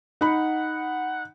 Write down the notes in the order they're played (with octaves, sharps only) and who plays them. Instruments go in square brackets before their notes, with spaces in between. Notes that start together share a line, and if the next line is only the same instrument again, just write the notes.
[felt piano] D#4 B5 [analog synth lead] F#5